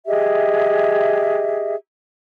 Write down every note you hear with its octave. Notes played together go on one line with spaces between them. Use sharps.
G4 G#4 D#5 E5